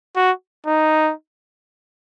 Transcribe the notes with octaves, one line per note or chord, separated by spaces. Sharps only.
F#4
D#4